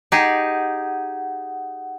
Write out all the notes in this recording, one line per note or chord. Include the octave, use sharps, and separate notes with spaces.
D#4 G4 G#4 F#5